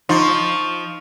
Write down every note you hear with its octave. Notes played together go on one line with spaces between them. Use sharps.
F3 D#4 C6 C#6